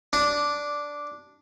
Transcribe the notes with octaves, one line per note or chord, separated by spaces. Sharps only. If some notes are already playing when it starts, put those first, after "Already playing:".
D4